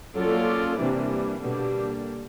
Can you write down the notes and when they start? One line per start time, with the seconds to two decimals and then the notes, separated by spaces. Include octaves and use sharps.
0.15 F#3 A#3 C#4 F4 A4 D5
0.79 C3 E3 G3 A#3 D4
1.43 B2 D3 G3 A#3 D4 G4